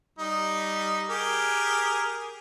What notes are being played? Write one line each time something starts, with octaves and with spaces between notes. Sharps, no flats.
G3 D#4
G4 G#4 A#4